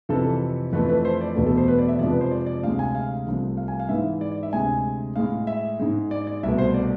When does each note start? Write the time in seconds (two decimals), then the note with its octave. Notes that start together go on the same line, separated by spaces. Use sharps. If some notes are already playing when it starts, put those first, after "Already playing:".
0.09 F2 C3 E3 A4
0.73 F2 E3 A3 B4
0.89 B4
1.05 C5
1.21 D5
1.36 E2 B2 A3
1.46 A4
1.57 C5
1.68 B4
1.79 D5
1.88 E5
1.99 F2 C3 F3 G#3 D5
2.11 B4
2.21 C5
2.31 D5
2.46 D5
2.63 D2 C3 G#3 F5
2.79 G#5
2.95 F5
3.26 C2 C3 F3 A3
3.57 F5
3.68 G#5
3.80 F5
3.89 G#2 E3 G#3 E5
4.21 D5
4.32 D5
4.43 E5
4.53 D2 C3 G#3 G#5
5.16 A2 G#3 F5
5.47 E5
5.80 G#2 G#3
6.11 D5
6.27 D5
6.43 C2 B2 A3 E5
6.58 C5
6.74 D5